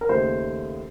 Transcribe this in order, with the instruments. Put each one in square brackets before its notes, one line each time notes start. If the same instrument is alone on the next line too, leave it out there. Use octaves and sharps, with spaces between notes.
[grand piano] A#4
D#2 C#3 A3 C5